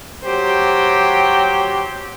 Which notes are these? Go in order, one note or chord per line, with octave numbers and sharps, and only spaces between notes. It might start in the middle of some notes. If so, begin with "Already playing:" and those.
F#3 G4 C5